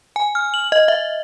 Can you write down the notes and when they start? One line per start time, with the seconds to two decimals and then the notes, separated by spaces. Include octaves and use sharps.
0.16 G#5
0.35 F6
0.54 F#7
0.72 D#5
0.88 E5